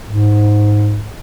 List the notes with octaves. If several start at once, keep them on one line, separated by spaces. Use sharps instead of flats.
G#2